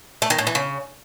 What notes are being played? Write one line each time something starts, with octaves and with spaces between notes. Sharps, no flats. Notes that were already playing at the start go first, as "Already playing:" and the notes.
A3
D#3
A2
E3
C#3